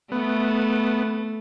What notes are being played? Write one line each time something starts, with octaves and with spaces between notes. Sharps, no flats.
A3 B3